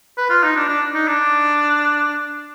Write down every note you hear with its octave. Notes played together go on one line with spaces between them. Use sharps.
B4
F4
D#4
D4
D4
D#4
D4